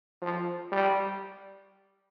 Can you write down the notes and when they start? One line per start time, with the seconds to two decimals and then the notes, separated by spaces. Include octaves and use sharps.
0.22 F3
0.72 G3